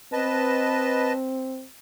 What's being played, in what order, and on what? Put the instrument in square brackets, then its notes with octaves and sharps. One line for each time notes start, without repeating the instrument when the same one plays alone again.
[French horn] C4 [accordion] B4 D#5 A5